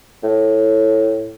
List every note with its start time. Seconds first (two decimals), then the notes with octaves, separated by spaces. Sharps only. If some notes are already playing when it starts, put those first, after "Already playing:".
0.23 A2